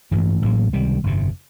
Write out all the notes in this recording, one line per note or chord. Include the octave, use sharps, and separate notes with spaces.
A1 G2 E3
A1 A2 F#3 A#3
C#2 C3 D#3 G3
G1 F2 C3